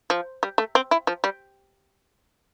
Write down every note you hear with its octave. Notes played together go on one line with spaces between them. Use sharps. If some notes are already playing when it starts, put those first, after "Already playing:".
F3
G3
A3
C4
E4
F3
G3